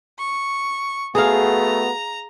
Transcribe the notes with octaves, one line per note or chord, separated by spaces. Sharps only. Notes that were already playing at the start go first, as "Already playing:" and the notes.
C#6
A3 B3 F#4 G#4 F5 A#5